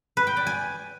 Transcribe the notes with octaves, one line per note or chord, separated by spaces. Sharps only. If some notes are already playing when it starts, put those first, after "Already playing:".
B4
G5
D5
G#5